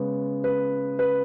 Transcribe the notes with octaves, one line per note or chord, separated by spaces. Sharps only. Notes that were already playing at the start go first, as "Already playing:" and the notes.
Already playing: C#3 G#3 B3
B4
B4